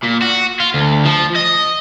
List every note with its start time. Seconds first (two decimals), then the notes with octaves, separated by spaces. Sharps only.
0.03 A#2
0.22 F#4
0.60 F4
0.74 D2
1.05 F3
1.35 D#5